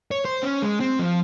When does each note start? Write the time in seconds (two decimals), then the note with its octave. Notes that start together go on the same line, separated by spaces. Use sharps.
0.11 C#5
0.25 C5
0.43 C#4
0.62 G#3
0.80 C4
0.99 F3